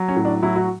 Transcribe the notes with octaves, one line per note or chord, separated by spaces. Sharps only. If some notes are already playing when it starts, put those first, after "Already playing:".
Already playing: F#3
C#4
A2
D4
F#3 E4
F#4